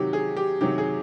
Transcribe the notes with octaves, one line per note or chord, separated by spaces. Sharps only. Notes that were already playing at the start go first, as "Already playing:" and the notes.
Already playing: C3 D#3 F#3 G4
G#4
G4
C3 D#3 F#3 G4
G#4